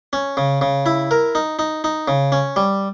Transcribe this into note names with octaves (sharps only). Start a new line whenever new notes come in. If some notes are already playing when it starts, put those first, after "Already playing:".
C#4
C#3
C#3
E4
A#4
D#4
D#4
D#4
C#3
C#4
G3